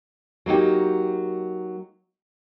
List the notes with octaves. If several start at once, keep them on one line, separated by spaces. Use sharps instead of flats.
F#3 A#3 D#4 G4